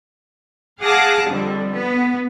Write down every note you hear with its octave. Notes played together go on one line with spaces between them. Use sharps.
G#4 F5 F#5 A5 D6 A#6
F2 D3 G3
B3